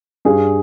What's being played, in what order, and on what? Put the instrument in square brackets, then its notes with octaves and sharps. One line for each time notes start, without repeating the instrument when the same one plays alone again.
[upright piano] G2 G#4